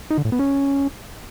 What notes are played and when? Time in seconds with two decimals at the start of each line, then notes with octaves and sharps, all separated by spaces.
0.11 D#4
0.18 D3
0.25 A2
0.32 B3
0.39 C#4